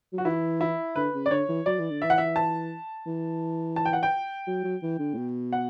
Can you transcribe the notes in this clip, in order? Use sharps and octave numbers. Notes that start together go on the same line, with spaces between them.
F#3
F#4
E3 E4
E4
D3 B4
C#3
D5
D3 C#5
E3
F#3 D5
E3
D3
E3 E5
F#5
E5
A5
E3
A5
G5
F#5
G5
F#3
F#3
E3
D3
A2
B2
F#5